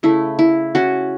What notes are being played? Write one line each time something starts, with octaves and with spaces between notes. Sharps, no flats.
C#3 A3 E4
E4
C#4 F#4